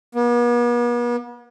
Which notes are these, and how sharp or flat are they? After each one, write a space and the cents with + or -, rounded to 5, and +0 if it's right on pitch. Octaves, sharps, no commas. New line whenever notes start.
B3 -45